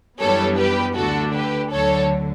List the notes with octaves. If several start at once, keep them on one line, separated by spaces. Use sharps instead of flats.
F#2 E3 G3 B3 D4 A4 C#5
G4 B4
D2 D3 A3 D4 F#4 A4
G4 B4
D2 D3 F#3 A4 C#5